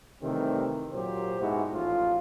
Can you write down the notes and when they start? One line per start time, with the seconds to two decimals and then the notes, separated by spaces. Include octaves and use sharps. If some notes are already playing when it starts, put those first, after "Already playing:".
0.23 C3 D#3 E3 G3 A3 C4
0.93 A#2 F#3 G4 C5
1.40 G#2 B2 G#3 E4 F#4
1.73 A1 A2 F3 F4